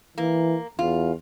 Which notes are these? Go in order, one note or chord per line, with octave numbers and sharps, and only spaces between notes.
E3 A#3
E2 F4